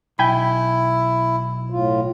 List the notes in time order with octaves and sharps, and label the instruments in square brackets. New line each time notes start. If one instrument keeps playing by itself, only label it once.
[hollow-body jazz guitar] B1 [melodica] E4 [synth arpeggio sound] G5 G#5 B5
[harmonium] A2 F4